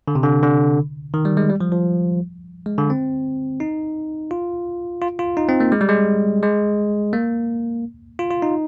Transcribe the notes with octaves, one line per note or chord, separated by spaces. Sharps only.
D3
C3
D3
D3
D#3
G3
G#3
G3
F3
F3
G#3
D3
C4
D#4
F4
F4
F4
D#4
C4
A#3
G#3
G3
G#3
G#3
A#3
F4
F4
D#4